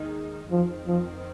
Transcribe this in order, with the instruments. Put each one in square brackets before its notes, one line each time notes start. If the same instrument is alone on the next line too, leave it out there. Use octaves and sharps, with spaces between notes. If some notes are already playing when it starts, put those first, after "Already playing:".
Already playing: [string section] D#2 D#3 G#3 D#4
[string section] F2 D#3 C4 [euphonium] F3
[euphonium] F3